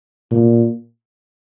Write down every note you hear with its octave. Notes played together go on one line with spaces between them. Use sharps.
A#2